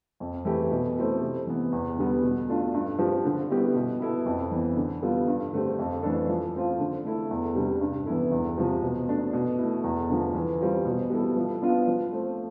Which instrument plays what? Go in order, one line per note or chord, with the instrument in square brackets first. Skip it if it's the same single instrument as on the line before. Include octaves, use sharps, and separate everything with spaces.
[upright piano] F2
E3 A3 E4 G4
B2
A3 C4 E4 A4
C3
E3 B3
E2
D3 G3 B3
B2
A3 D4 F4
G2
F3 C4 G4
D3
G3 B3 E4 G4
B2
B3 E4 A4
F2
E3 B3
D3
G3 B3 F4 A4
G2
D3 A3 C4 G4
F2
E3 A3 D4 A4
F3
A3 C4 F4
D3
A3 E4 A4
E2
C3 G3 D4
G2
E3 B3 E4 A4
E2
C3 F3
B2
A3 D4
B2
A3 E4
E2
D3 F3
E3
G3 C4 F4
B2
G3 B3 E4 A4
F3
B3 D4 F4
F3
A3 C4